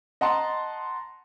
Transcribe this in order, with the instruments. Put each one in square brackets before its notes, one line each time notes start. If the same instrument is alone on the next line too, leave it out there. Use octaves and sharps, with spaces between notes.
[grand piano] D#5 F#5 A5 A#5 C6